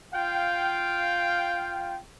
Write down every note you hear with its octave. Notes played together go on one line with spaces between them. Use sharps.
F4 F5 G5